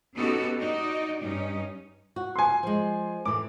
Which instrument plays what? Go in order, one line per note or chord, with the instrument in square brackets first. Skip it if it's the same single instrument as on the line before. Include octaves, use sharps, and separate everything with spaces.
[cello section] B3 C#4 D#4 F#4 G4 A4
D#4 F#4 D5 D#5
G2 C#4 D#4
[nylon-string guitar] F#4
[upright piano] G#5 C6
[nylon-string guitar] F3 G#3
[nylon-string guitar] A2 E3 [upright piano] D6